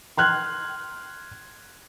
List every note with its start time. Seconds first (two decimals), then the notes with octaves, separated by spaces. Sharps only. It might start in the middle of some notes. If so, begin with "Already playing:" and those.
0.17 C6 F6 F#6 G#6